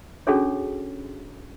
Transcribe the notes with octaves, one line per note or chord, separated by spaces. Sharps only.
C#4 D4 F#4 G#4 A4 C#5